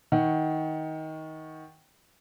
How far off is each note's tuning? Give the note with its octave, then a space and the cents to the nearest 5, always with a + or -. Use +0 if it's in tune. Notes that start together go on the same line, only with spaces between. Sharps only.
D#3 +20 F#5 +10